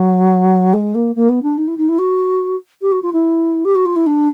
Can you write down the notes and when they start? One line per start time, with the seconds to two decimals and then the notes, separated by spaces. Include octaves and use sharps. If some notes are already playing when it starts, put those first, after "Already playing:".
Already playing: F#3
0.73 G#3
0.95 A#3
1.15 A#3
1.29 B3
1.42 D4
1.57 D#4
1.67 E4
1.77 D#4
1.88 E4
1.98 F#4
2.82 G4
2.92 F#4
3.02 F4
3.13 E4
3.65 G4
3.75 F#4
3.85 F4
3.96 E4
4.06 D4